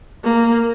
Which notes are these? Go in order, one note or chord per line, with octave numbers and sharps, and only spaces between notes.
A#3